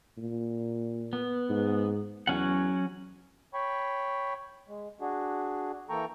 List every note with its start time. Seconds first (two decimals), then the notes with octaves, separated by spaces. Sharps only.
0.18 A#2
1.13 B3
1.49 G#2
2.27 E2 F#3 C#4 F#5
3.54 C#5 G5 B5 C#6
4.68 G#3
5.01 D4 F#4 G#4
5.89 E3 A#3 A4 G5 A#5 C#6